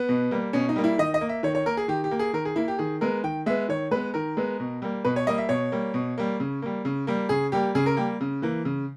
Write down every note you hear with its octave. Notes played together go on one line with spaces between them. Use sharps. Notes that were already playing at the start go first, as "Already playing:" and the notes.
Already playing: B3
B2
G3 A#3
B2 C#4
D#4
G3 A#3
E4
D#3 D#5
D#5
A#3
E5
D#3 C#5
C#5
A#3 A#4
G#4
D#3 G4
G4
A#3
G#4
D#3 A#4
G#4
A#3 E4
G4
D#3 G#4
G#3 B3 A#4
D#3 G5
G#3 B3 E5
D#3 C#5
G#3 B3 B4
D#3 A#4
G#3 B3
B2
G3 A#3
B2 B4
C#5
G3 A#3 D#5
E5
B2 C#5
G3 A#3
B2
G3 A#3
C#3
G3 A#3
C#3
G3 A#3
C#3 G#4
G3 A#3 G4
C#3 G#4
A#4
G3 A#3 G4
C#3
E3 A#3
C#3